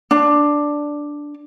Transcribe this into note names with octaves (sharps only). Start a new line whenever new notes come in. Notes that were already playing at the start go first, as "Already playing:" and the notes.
D4